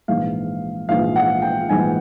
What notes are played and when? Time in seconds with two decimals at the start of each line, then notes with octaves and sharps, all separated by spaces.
0.08 A#1 G#2 E3 F5
0.89 A#1 G#2 E3 F5
1.16 F#5
1.42 G5
1.69 A#1 G#2 E3 G#5